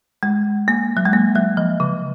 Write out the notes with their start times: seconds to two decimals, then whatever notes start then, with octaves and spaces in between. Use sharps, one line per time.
0.23 G#3
0.68 A#3
0.97 F#3
1.05 G#3
1.13 A#3
1.35 F#3
1.57 F3
1.80 C#3